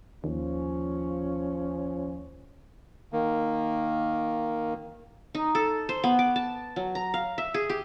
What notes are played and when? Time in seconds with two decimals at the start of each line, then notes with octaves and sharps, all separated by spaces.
0.24 D#2 F3 C#4
3.13 D#3 A#3
5.35 D#4
5.55 A4
5.89 C5
6.04 B3
6.19 D6
6.36 A5
6.76 F#3
6.95 A#5
7.14 F5
7.38 E5
7.54 G#4
7.70 G4